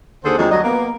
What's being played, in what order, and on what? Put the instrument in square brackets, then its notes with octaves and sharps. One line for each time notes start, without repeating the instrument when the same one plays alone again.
[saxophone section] D#2 D3 G#4 A4 C5
F2 D#3 F#3 G#3 A3 D4
D2 F#3 G3 D#5
A#3 B3